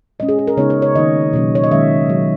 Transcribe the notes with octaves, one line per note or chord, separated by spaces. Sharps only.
A#2 G#3 C#4 D#5
G#4
G#4
A#4
C#3 G#3 B3 D#4 C#5
C#5
C#5
D#3 A#3 D#4 D#5
B2 F#3 A#3 C#4
C#5
D#5
D#3 G#3 C#4 E5
B2 F#3 C#4